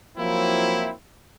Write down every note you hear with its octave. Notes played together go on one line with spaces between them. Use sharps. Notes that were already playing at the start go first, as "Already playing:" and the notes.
F3 F#3 A#3 C4 E4